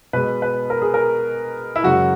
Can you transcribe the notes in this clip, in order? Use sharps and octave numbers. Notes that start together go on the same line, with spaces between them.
B2 G#3 B4
B4
A#4
G#4
A#4
E4
F#2 C#3 G#3 F#4